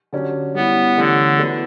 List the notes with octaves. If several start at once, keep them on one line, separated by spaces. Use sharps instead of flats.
D3 F#3 C#4 G4 D5
G3 B3 C#4 E4
D3 E3 A3 C#4 G4 D5
F#3 B3 E4 A4 D5